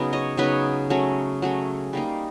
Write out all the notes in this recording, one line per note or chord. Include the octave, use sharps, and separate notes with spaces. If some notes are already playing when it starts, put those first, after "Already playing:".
Already playing: C#3 F#3 B3 D#4
C#5 D#5
C#3 F#3 B3 D#4 B4 C#5
F#3 A3 C#4
F#3 A3 C#4
G3 A#3 D#4